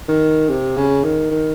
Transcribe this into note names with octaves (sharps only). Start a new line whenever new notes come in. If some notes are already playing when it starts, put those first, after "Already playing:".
D#3
C3
C#3
D#3
D#3